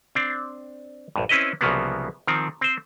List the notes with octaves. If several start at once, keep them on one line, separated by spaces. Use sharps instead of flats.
C4 D4
A#1 G2
C4 C#4 E4 B4 D#5
C2 C#3 F3 F#3 A#3 B3
D#3 F3 C4
C4 C5